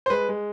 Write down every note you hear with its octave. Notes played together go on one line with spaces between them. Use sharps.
C5
G#3 B4
G#3